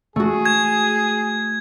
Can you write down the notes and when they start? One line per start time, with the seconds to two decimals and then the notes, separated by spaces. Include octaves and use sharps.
0.16 A3 F#4 G#4
0.45 G#6